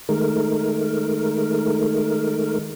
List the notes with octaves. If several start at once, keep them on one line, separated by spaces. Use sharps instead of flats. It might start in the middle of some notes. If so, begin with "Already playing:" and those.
D#3 G#3 A3 A#4